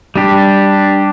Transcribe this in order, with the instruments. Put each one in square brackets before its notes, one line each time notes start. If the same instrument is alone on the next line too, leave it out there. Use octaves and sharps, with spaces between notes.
[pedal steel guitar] G3 D4 G4